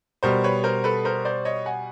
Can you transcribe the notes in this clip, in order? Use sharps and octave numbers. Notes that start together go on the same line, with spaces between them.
B2 G3 A#4 C5
B4 C#5
A#4 C5
A4 B4
A#4 C5
C5 D5
C#5 D#5
F#5 G#5